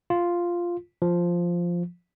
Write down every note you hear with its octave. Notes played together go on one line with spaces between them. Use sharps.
F4
F3